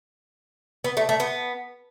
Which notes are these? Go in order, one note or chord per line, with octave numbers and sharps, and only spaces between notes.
B3
A3
A3
B3